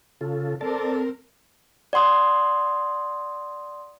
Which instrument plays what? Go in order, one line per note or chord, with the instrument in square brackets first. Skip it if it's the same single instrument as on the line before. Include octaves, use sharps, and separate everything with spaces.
[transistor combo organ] C#3 [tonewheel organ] F4 A4
[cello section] C4 A#4 [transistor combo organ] A4 [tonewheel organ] D5 A5
[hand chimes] D5 F#5 C6 D#6